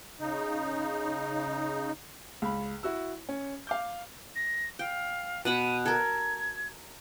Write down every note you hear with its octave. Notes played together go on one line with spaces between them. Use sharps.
C#3 D#4
C#2 B5
E4 F#4 E6
C#4
F5 D6 G6
A#6
F5 G5
B2 F#5 B5 D#7
A4 A#4 G#6